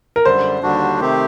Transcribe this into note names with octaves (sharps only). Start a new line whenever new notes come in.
A#4
F#2 D3 G3 C5
D#2 D3 G3 D4 F#4
C3 D#3 A3 C4 G4